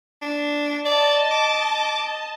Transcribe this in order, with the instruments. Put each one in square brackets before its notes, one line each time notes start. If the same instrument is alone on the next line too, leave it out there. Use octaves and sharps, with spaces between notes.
[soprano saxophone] D4
[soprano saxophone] D5 [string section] D#5 A5
[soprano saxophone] D6